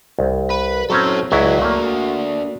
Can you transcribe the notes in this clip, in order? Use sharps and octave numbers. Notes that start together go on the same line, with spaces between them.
C2
B4
F#3 C4 C#4 A4 C#5
C#2 F#3 D4 E4 F#4
A3 A#3